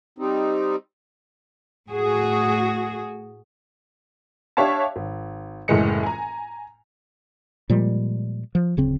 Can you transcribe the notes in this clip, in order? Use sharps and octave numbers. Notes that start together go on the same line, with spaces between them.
G3 C4 D#4
A2 F#4 G#4
D4 G4 C#5 E5 F5 A5
G#1
F#1 A2 E3 G#3 C#7
G#5 A#5
A#2 F3 G3 G#3
F3
D1 C#3 C4